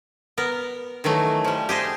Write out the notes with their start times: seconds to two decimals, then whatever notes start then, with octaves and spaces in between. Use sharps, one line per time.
0.38 B3 A#4
1.04 D#3 E3 F#3 A3
1.44 F3 G3
1.69 G4 G#4 C5 D#5